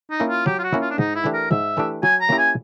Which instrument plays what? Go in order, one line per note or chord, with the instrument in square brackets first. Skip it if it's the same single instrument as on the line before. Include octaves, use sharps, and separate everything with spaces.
[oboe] D#4
[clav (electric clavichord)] A#3 C#4 E4
[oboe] F4
[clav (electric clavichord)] F#3 [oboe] G4
[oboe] F4
F#4
[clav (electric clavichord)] A#3 C#4 E4
[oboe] F4
D4
[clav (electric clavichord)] G#2 [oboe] D#4
[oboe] E4
[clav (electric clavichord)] E3 A3 D4 G4
[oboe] A#4
[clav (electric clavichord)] G#2 [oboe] E5
[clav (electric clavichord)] E3 A3 D4 G4
[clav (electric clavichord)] F#3 [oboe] G#5
[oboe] A#5
[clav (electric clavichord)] A#3 C#4 E4 G4
[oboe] G#5